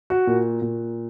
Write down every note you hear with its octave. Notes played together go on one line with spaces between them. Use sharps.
F#4
A#2
A#2